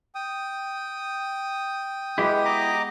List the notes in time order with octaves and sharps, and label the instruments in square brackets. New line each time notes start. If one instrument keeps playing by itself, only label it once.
[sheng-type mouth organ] G5 D#6
[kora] G#3 B3 F#4 [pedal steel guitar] E4 G4
[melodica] D#5 A#5 D6